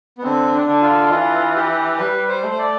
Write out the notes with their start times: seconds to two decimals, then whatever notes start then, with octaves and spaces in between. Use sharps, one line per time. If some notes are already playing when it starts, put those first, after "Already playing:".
0.18 B3
0.23 D3 C4
0.53 D4
0.67 D3
0.82 F4
1.11 E3 F4
1.56 G4
1.99 G3 B4
2.28 C5
2.44 A3
2.51 C5
2.58 D5